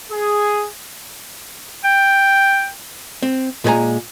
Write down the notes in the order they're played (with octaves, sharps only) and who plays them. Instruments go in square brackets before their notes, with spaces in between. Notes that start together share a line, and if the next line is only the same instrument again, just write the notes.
[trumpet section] G#4
[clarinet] G5
[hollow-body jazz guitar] C4
A#2 G#3 A4 C5 G#5 A#5